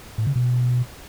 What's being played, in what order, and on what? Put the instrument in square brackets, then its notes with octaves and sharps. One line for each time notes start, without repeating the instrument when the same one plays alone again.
[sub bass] A2
C#3
B2